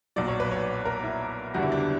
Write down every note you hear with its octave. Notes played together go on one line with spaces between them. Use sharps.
B1 A#2 F#3 D5
C#5
B4
C#5
A#4
E4
F#1 E2 D3 G3 F#4
E4
D4
E4